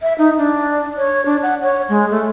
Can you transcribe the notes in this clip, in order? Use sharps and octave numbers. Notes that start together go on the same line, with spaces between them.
E5
D#4
D4
C#5
D4
F#5
C#5
G#3
A3